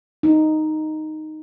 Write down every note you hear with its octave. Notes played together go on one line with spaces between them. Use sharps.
D#4